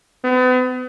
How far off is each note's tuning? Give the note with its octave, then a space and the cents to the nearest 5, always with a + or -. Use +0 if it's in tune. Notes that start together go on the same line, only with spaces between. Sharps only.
B3 +40